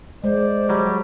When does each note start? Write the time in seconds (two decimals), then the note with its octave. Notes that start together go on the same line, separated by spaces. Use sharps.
0.24 G#3 C5 D5
0.69 F#3 G3 G4